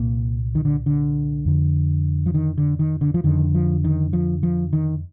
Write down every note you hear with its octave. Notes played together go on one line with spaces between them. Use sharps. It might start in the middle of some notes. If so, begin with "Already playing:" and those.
Already playing: C2 A#2 A#3
D#3
D3
D3
F2 D3
F3
D#3
D3
D#3
D3
F3
F2 D3 D#3
F3
D#3
F3
F3
D#3